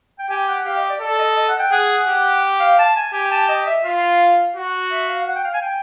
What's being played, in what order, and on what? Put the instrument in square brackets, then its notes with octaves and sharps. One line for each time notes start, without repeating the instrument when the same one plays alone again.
[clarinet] G5
[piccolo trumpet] G4 [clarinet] G#5
[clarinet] F#5
[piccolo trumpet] G4 [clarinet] F5
[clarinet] D#5
D5
[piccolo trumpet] A4 [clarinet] D5
[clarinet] D#5
D#5
F#5
G5
[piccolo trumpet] G#4 [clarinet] F#5
[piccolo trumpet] G4
[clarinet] F5
A5
G#5
[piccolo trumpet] G4 [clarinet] G#5
[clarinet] A5
D#5
E5
[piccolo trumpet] F4 [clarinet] F5
[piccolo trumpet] F#4
[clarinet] E5
F5
F5
F#5
G5
F5
G#5
G5